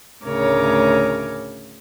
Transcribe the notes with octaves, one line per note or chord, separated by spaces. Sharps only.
D2 A2 C#3 A#4 C#5 D6